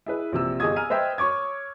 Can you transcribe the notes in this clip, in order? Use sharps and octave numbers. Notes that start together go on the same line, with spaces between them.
E4 G#4 B4
A#1 C3 E6
G1 G4 G#4 D#5 D#6 G#6
G#5 A#5 F6 D#7
B4 C5 D#5 E5 G5
C#5 C#6 D6 G#6